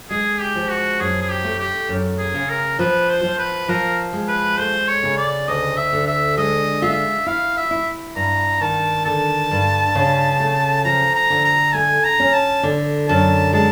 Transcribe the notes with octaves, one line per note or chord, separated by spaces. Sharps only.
G#3 G#4
G4
F3
F#4
F#2 G#4
G#4
G4
A3
G4
F#2
G#4
C#3
A#4
F3 B4
C5
F3
B4
F3 A#4
G#3
B4
A3 C5
C#5
C#3
D5
D2 D#5
E5
D3
E5
G#3 D#5
F4 E5
E4 F5
E5
E4
G2 A#5
D#3 A5
D3 A5
G2
C#3
A3
F3 A#5
A#5
D3
A#5
A3 G#5
A#5
C#4
A5
D3
F#2 A5
G#3 A5